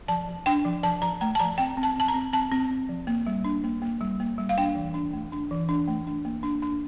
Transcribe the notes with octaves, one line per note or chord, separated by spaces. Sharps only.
F3 A5
F3
D4 G5
F3
F3 A5
F3 A#5
A3 A#5
A5
F3 A#5
C4 G5
C4
A5
C4 A5
A#5
C4
C4 A5
C4
C4
F3
A#3
G3
D4
A#3
A#3
G3
A#3
G3
F5
D4 G5
E3
D4
A3
D4
E3
D4
A3
D4
A#3
D4
D4